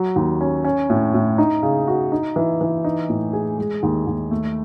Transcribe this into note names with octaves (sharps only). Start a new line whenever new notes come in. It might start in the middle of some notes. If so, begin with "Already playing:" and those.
Already playing: F#3
D#2
C#4
C#4
A2
A2
D#4
C#3
F#4
D#4
E3
E3
D#4
A2
G#4
G#3
D#2
D#2
A3